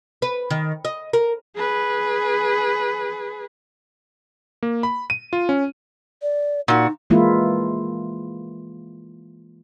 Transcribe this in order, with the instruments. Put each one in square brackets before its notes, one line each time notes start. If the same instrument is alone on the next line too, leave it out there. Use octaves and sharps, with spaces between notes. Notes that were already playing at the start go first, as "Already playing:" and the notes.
[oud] B4
D#3
D#5
A#4
[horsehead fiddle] G#4 B4
[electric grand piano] A#3
B5
D#7
F4
C#4
[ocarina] D5
[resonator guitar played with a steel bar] A#2 F#4 [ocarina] D#4
[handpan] E3 G#3 A#3 E4 F4